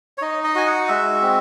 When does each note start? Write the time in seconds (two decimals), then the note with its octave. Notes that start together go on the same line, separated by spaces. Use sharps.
0.18 C#5
0.22 D#4 D#5
0.44 D#5
0.55 F#4 G#5
0.66 F#5
0.88 G#3 E5
1.22 C4